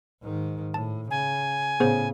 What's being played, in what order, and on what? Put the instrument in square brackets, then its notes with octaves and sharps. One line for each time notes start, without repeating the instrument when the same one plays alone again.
[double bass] G#2 D#3
[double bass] A2 [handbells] A5
[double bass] C#3 [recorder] G#5
[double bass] A2 C#3 [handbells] B3 G#4 C5